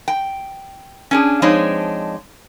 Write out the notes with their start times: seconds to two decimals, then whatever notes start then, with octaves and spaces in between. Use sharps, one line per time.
0.08 G5
1.11 C#4 D4 G#4
1.42 F3 G#3 C4 D4 D#4 C#5